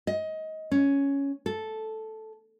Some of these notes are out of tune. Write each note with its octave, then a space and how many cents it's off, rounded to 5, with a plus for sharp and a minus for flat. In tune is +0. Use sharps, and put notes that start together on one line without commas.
D#5 +20
C#4 +5
A4 -5